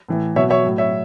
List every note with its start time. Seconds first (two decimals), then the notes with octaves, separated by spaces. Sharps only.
0.09 A2 E3
0.36 B2 F#3 C#5 E5
0.50 C#5 E5
0.64 A2 F#3
0.78 C#5 E5